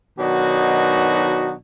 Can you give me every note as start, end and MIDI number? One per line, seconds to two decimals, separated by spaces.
0.19 1.54 47
0.19 1.54 51
0.19 1.54 54
0.19 1.54 62
0.19 1.54 63
0.19 1.54 66